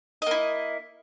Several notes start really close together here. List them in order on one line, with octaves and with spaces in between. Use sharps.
D#5 A#3 E4